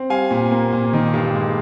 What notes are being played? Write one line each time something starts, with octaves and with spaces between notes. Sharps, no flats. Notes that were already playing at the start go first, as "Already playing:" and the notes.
Already playing: C4
G3 F5 G#5
A#2
A#3
A#2
D#3
G2
G#3